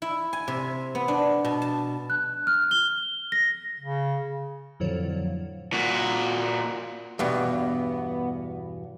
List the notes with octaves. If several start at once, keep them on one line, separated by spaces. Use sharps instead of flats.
E4
G#5
C3
B3
D4
B2
A5
F#6
F6
G7
A#6
C#3
F2 A2 D3 F3 F#3
A#2 F#4
E2 G2 B2 B3